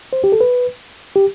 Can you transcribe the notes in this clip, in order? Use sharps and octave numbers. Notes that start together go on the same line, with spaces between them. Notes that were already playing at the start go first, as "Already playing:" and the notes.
C5
G4
A4
B4
G4